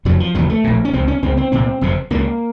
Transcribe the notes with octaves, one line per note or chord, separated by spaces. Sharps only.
F1 F2 C#3 F#3
F3
F1 D#2 C#3 F#3
A3
A#1 A#2
C#4
C#2 C3 C4
C#4
C#2 C#3 C4
C4
C2 A#2 C4
F#1 F2 C3
C#2 C#3 A#3